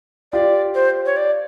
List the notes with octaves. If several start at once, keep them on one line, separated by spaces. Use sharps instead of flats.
F4 G4 D5
C5
C#5
D5